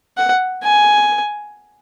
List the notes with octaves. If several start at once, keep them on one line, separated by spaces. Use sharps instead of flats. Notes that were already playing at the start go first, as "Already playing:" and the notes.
F#5
G#5